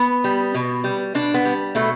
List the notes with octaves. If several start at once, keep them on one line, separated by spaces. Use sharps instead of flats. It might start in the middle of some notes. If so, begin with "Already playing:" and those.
Already playing: B3
G3
B2
G3
B2 D4
B3
G3
B2 A3